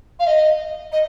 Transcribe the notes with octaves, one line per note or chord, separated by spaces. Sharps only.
F5
D#5
D#5